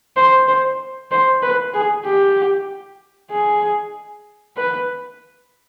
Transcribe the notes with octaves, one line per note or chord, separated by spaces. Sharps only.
C5
C5
C5
B4
G#4
G4
G#4
B4